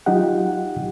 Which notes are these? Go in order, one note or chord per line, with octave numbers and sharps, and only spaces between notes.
F#3 D#4 F4 G4 F#5